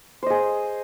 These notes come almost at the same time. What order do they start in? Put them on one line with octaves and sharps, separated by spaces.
C5 D#5 G#4